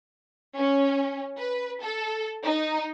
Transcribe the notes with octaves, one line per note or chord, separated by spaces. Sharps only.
C#4
B4
A4
D#4